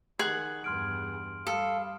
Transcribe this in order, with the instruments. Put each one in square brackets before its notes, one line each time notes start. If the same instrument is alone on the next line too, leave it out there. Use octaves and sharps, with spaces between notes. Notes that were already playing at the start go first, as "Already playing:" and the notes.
[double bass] D#3 [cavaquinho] G#4 F#5 [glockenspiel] F#7
[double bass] E2 G2 [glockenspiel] C6 F6 D7
[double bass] G3 [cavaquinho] A4 [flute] F5 [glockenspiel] D#6